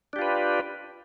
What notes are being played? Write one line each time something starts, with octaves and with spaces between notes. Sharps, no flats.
D4 F4 G4 B4